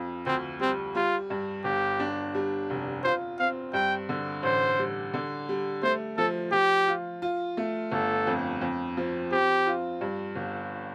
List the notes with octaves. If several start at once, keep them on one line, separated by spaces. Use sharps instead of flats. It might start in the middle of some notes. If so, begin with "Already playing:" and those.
Already playing: F2 F4
D2 C4
G3 C4
G3 F4
G2
G1 G4
D4
G3
F1
F4 C5
C4 F5
G2 G5
D3
A1 C5
G3
D3
G3
A3 C5
F3 A4
F3 G4
F4
F4
A3
G1 A4
F2
F2
F3
C4 G4
F4
G2
G1